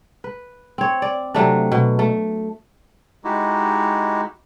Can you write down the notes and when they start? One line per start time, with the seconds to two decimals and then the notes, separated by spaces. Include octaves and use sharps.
0.24 B4
0.78 C4 C#5
1.02 D5
1.34 C3 F#3 A3 D4
1.72 B2
1.99 A3
3.24 G#3 D#4 E4 F#4 G4